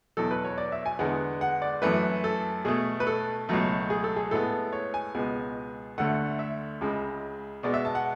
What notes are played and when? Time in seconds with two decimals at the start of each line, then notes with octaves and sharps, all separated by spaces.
0.17 E2 B2 F#3 A4
0.31 B4
0.45 C#5
0.58 D5
0.72 E5
0.86 G#5
0.99 E2 D3 G#3 B3 F#5
1.41 F#5
1.62 D5
1.82 F#2 E3 A3 B4
2.24 A4
2.65 B2 A3 G#4
3.00 B4
3.07 A4
3.49 C#2 B2 F#3 A3
3.90 G#4
4.04 A4
4.16 G#4
4.31 A2 G#3 B3 A4
4.73 C#5
4.94 G#5
5.15 C#2 B2 G#3 B3
5.98 D2 D3 A3 F#5
6.39 E5
6.81 C#2 C#3 G#3
7.63 B2 G#3 B3 D5
7.74 E5
7.85 A5
7.95 F#5